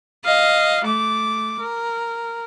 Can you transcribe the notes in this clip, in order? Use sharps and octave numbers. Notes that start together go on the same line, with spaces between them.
D#5 F5
A3 D6
A#4